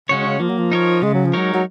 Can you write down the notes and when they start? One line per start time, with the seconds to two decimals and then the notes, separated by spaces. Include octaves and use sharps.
0.09 C#3 G#3 C#4 F#4 C#5
0.25 C#3
0.40 F3 A#3
0.49 F#3
0.58 F3
0.72 D#4 A#4 C#5
1.02 C#3 G#3
1.14 F#3
1.25 F3
1.33 F#3 G#3 D#4 A#4 C#5
1.54 F#3